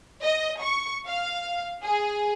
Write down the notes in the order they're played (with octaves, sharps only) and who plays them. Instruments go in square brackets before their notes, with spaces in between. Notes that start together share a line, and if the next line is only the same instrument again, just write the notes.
[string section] D#5
C#6
F5
G#4